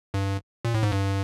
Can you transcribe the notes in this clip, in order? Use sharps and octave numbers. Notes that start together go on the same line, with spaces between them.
G2
A#2
A2
G#2
G2